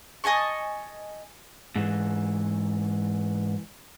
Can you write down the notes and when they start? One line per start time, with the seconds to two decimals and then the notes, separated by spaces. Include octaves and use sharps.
0.24 D#5 G#5 A5 C#6
1.76 G#2 E3